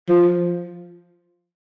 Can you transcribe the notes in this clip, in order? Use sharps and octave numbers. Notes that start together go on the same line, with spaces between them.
F3